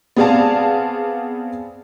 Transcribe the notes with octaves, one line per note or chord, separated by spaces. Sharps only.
B3 C4 G#4 D5 F5 A5